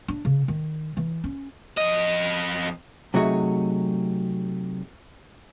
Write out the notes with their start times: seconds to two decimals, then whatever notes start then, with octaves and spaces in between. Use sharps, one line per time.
0.08 D4
0.25 C#3
0.48 D#3
0.97 E3
1.24 C#4
1.77 F2 D#5
3.14 C3 F#3 A3 D#4 F#4 G#4